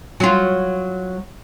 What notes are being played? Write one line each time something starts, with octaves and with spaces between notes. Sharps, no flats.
F#3 F4